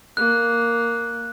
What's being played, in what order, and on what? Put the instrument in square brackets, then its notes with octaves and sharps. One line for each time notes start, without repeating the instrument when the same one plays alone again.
[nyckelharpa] A#3 [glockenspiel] F#6